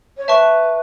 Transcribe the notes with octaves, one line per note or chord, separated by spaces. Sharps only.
C#5
B4 E5 A5 C#6